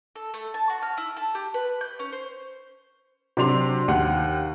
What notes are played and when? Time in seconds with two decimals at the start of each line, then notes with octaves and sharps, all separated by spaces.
0.16 A4
0.34 A3
0.54 A5
0.70 F#4
0.82 F6
0.97 E4
1.17 A4
1.35 G4
1.54 B4
1.81 G6
1.99 C#4
2.12 C5
3.37 C3 F#3 D4 C6 F7
3.88 D#2 F#5